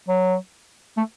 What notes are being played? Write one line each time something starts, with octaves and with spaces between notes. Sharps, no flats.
F#3
A3